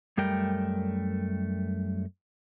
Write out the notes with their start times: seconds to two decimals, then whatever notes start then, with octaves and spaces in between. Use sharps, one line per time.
0.17 F#2 G3 A3 A#4 G5